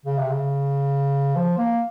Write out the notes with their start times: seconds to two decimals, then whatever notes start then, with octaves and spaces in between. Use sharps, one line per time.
0.06 C#3
0.18 C3
0.31 C#3
1.35 F3
1.58 A#3